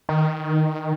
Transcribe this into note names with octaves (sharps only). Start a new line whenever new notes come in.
D#3